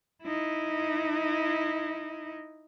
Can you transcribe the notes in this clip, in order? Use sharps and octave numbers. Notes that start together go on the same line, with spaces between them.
D#4 E4